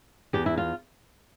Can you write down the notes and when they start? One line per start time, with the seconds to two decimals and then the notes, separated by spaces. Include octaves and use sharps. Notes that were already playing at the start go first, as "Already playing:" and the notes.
0.33 E2 G4
0.46 E4
0.58 F4